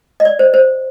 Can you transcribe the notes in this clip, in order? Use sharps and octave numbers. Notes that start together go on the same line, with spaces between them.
D#5
D5
C5
C5